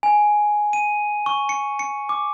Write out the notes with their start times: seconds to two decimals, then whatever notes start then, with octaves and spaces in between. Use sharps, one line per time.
0.03 G#5
0.73 D#7
1.26 C#6
1.49 C#7
1.79 C#7
2.09 D6